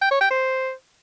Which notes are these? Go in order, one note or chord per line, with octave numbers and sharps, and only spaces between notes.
G5
C#5
G5
C5